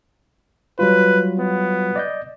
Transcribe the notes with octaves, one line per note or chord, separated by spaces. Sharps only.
F#3 G3 F4 B4
B3
D5 D#5 G6